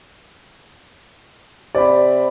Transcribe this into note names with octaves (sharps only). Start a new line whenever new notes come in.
C3 D5 B5